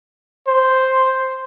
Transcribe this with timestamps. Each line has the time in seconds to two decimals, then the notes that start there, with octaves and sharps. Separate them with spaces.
0.47 C5